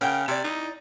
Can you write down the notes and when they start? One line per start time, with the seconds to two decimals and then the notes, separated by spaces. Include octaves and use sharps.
0.01 C#3 A#4 F#5 G5
0.28 C3 E4 D5
0.44 D#4